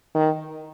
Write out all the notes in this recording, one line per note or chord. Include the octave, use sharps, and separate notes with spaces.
D#3